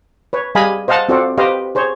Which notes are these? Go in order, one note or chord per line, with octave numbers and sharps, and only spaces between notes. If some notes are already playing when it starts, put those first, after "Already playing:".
B4 C#5
G3 G#4 D#5 F5 G#5 B5
C5 D#5 F5 F#5 A5
C4 F4 F#4 A4 D5 F#5
G4 B4 C5 D#5 F5
G#4 C5 C#5